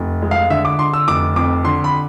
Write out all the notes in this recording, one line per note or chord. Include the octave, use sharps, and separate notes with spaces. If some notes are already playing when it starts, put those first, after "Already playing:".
Already playing: F1
G#3
F5
D3 E5
D6
D3 C6
E6
F1 D6
F2 D6
D3 C6
B5